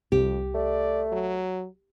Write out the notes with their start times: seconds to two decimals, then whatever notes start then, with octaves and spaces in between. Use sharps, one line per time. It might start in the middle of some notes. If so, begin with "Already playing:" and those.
0.12 C2 F2 G4
0.55 A3 D5
1.12 F#3